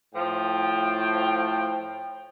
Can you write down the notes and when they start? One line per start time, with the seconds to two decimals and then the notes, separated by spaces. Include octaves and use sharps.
0.14 A2 F3 G5